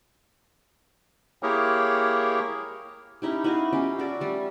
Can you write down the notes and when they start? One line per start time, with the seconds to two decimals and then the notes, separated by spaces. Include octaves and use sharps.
1.43 A#3 E4 G4 G#4 A#4 C#5
3.22 C#4 D#4 E4 G4
3.44 E4 F#4 D#5 F5
3.73 C#4 F4 G4
3.98 F#4 A4 D5
4.21 G3 A3